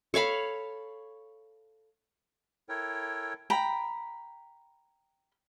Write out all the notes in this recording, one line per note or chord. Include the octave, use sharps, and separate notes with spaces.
A4 C#5 F5 B5
E4 A4 A#4 C#5 G5
G5 A#5 B5